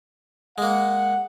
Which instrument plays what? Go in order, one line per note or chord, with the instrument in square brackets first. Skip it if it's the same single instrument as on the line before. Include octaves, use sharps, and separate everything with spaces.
[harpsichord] G#3 A#3 [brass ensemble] F#5